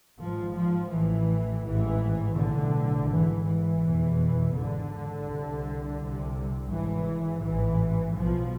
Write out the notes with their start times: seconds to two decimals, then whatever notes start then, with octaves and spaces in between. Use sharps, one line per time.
0.19 G#1 G#2 F3
0.55 F3
0.91 A1 A2 E3
1.63 A1 G#2 E3
2.36 B1 A2 D3
3.09 G#1 G#2 E3
3.45 E3
3.80 F1 E2 B2
4.53 G#1 G#2 D3
5.25 C2 C3
5.98 C2 C3
6.70 G#1 G#2 E3
7.42 A1 G#2 E3
8.15 B1 B2 F3